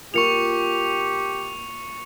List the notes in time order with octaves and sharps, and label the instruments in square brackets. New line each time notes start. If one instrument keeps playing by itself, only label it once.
[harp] A#3 F4 [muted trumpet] G4 [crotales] C#6 C#7 F7